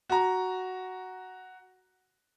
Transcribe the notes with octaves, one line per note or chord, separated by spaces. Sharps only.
F#4 A#5